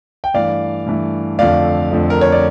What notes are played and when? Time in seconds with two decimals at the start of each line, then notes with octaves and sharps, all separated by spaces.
0.24 G5
0.34 G2 E3 A3 D5 F5
0.86 G2 E3 A3
1.39 F2 D3 F3 A3 D5 F5
1.91 F2 D3 F3 A3
2.10 A#4
2.21 C#5
2.32 D5